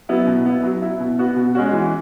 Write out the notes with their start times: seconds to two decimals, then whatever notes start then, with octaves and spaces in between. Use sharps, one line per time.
0.09 F#3 B3 E4
0.27 B2
0.46 B3 E4
0.63 F#3
0.82 E4
1.00 B2
1.19 B3 F#4
1.36 B2
1.55 G#3 C#4 F#4
1.73 E3